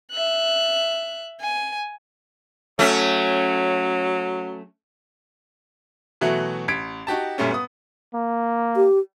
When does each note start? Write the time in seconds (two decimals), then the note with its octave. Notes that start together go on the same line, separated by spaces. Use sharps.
0.12 E5 F#6
1.41 G#5
2.79 F#3 A3 C#4
6.21 B2 E3 F#3 A3 F#4
6.68 A1 G#6 B6 D7
7.07 D#4 F#4 G4 A5
7.38 F#2 A#2 G3 A3 C#4
7.51 B3 D#6
8.14 A#3
8.76 G4